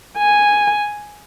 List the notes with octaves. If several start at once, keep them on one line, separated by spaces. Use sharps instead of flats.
G#5